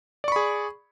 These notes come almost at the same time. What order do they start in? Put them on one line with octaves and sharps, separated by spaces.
D5 C#6 B5 G#4